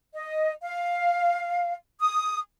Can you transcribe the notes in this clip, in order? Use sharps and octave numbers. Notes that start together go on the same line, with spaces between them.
D#5
F5
D#6